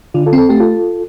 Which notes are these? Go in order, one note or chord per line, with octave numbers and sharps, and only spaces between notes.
D3 D4 F4
F4 A4
C4
A4
A3 G4
F4 A4